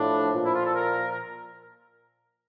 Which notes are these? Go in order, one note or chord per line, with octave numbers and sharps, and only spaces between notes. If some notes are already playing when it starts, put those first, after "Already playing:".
Already playing: A2 F3 D4
A#2 F3
E4
F4
A4
A#4
A#4